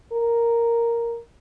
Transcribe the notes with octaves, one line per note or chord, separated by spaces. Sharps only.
A#4